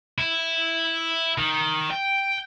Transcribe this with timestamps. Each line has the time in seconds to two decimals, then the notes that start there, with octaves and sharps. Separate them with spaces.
0.18 E4
1.38 D#3
1.90 G5